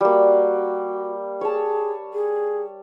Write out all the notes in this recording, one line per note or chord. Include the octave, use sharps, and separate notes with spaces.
G3 A#3 F#4
G#4 C#5 A5
G#4